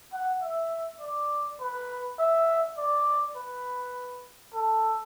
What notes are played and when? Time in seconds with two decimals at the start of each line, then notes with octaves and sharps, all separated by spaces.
0.13 F#5
0.42 E5
1.01 D5
1.61 B4
2.19 E5
2.78 D5
3.36 B4
4.54 A4